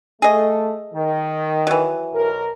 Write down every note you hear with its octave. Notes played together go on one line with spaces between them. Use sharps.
A3 G#4 D#5
D#3
E3 F#3
B1 A#4